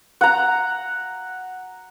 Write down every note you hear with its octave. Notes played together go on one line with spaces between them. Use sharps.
F#5 A#5